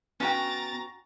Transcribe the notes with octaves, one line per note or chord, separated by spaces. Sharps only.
B3 C#4 F#4 G5 A#5 A6